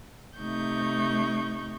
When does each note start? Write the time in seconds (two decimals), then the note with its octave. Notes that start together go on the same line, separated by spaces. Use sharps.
0.39 C3 A3 D#4 C#6 G6